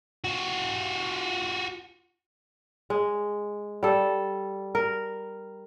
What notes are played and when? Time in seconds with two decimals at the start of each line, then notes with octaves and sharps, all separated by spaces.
0.24 F4 F#4
2.90 G#3
3.83 G3 A4
4.75 A#4